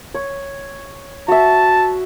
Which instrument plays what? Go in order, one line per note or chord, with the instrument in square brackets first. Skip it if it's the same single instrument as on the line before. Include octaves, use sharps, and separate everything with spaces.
[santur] C#5
[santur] F#4 E5 [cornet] A5